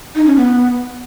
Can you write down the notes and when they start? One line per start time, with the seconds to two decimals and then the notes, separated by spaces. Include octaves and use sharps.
0.16 D#4
0.26 C#4
0.36 B3